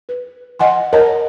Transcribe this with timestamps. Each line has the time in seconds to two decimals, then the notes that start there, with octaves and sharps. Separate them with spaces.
0.09 B4
0.59 D#5 F#5 G#5 C6
0.93 A#4 C#5 D#5 A5 A#5